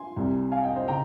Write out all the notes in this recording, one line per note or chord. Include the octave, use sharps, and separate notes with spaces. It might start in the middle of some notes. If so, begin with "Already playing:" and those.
Already playing: G#5 C6
C2 C3 G3
F5 G#5
D#5 G5
C5 D#5
C#3 G5 A#5